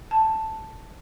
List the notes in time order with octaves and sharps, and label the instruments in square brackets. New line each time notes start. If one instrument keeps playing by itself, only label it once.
[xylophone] A5